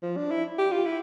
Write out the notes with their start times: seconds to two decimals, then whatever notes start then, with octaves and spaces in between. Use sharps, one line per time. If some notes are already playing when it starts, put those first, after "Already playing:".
0.03 F3
0.17 D4
0.31 E4
0.58 G4
0.72 F4
0.86 E4